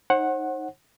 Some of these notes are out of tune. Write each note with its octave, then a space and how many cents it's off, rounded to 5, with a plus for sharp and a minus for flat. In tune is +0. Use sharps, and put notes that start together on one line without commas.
D#4 +0 C5 +45 F#5 +0